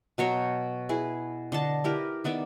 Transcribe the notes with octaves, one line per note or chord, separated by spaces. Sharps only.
B2 F#3 C#5 G5
E4 G#4 B4
D3 D#5 A5
E4 G4 A#4 B4
D#3 B3 D5 E5